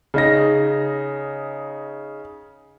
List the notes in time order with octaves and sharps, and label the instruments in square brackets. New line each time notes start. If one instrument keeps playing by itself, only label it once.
[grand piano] C#3 D#4 A#6